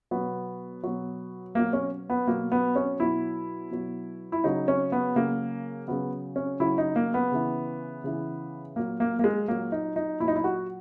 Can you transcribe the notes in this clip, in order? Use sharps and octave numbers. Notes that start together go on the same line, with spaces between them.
B2 F#3 B3
B2 F#3
B2 F#3 A#3
C#4
B3
B2 F#3 A#3
B3
C#4
B2 F#3 E4
B2 F#3
E4
C#3 F#3 D#4
C#4
B3
C#3 F#3 A#3
C#3 F#3 B3
C#4
C#3 F#3 E4
D#4
A#3
B3
C#3 E3
C#3 E3
A#2 F#3 A#3
A#3
A#3
G#3
A#2 F#3 A#3
D#4
D#4
A#2 F#3 D#4 E4
E4
F#4